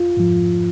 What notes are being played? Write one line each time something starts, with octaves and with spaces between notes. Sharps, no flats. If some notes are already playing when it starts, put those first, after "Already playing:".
Already playing: F4
G#2 F3